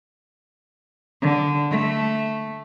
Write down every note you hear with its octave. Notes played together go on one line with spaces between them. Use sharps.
D3
A3